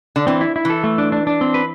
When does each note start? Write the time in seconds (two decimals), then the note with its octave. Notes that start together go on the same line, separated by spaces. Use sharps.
0.16 D3
0.27 E3 C4
0.41 E4
0.56 E4
0.65 E3 A4
0.84 A3
0.98 D4
1.12 D4
1.27 D4
1.41 C4
1.54 B4